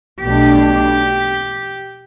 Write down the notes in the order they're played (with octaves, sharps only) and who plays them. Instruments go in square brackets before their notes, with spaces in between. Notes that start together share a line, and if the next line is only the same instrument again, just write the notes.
[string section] B1 B2 A3 D4 [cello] G4